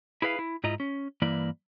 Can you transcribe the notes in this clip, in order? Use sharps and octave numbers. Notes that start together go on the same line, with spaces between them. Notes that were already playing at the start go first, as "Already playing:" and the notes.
E4 G#4 B4 E5 F5
E4
G#2 E4 F4 D#5 A#5
C#4
G2 E3 A#3 E4 D5